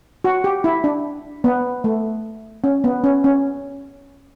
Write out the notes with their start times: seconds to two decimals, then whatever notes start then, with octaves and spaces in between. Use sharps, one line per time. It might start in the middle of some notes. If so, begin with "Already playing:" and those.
0.24 F#4
0.44 G4
0.64 E4
0.84 D4
1.44 B3
1.84 A3
2.64 C#4
2.84 B3
3.04 C#4
3.24 C#4